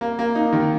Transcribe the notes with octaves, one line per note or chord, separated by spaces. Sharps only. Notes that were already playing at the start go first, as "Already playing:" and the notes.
A#3
A#3
D#4
D#3